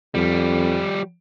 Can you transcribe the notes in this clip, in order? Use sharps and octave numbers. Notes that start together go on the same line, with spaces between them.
F2 F3 G3